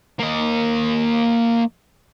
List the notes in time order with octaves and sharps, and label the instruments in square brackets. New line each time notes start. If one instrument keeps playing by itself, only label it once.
[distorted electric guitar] A#3 D#5